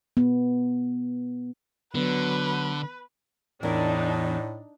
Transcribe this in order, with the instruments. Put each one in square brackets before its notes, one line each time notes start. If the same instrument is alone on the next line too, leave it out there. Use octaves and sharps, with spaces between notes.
[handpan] B3
[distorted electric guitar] D3 [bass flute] F#3 [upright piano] B3 [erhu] B4
[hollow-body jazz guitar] E2 A#4 [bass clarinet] A2 [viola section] D4 D#4